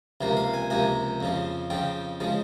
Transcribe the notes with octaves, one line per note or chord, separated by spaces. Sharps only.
C#2 C3 F3 A#3
F5
G#5
C#2 C3 F3 A#3 G#5
F2 C#3 F3
F2 C#3 F3 G5
C#3 F3 G#3